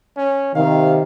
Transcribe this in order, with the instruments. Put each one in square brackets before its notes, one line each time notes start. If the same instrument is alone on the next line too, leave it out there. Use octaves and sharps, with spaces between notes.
[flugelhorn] C#4
[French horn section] C3 D#3 [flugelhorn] F5